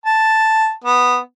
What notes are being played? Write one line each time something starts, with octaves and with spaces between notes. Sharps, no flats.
A5
B3